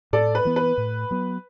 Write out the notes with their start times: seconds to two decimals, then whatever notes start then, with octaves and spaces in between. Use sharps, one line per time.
0.13 A2 A4 D5
0.35 B4
0.45 E3 B3
0.56 B4
0.78 A2
1.11 F#3 B3